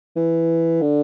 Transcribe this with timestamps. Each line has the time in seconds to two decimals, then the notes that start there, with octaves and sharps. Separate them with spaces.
0.16 E3
0.81 D3